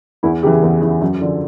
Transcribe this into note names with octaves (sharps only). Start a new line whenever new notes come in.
E2 E4
C#3 E3 G4
G#4
E2
C#3 E3
F#2
D3 F3